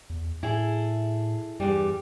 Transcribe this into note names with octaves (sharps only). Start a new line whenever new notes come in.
E2
A2 E4 G#4 A4
E2 G2 G3